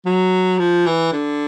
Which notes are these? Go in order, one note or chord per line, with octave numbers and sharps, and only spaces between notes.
F#3
F3
E3
D3